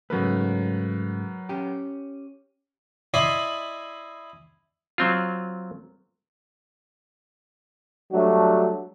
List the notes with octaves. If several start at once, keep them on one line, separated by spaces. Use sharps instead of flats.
G#2 C#3 F#3 A3 A#4 B4
C#4 G4
E4 D5 D#5 G#5 B5 C6
F#3 C4 F4
F#3 G3 A3 D4 F#4